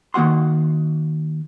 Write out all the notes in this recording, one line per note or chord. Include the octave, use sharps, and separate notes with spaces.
D#3 A#3 F#4 F#5 C6